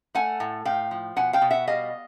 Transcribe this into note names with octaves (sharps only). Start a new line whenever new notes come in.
A3 F#5 G#5
A2
A2 F5 G5
F3
B2 F#5 G#5
F5 G5
B2
E5 F#5
G3 D#5 F5